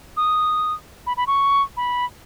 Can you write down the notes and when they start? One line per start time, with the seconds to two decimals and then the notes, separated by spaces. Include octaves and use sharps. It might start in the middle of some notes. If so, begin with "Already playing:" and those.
0.17 D#6
1.07 B5
1.17 B5
1.27 C#6
1.77 B5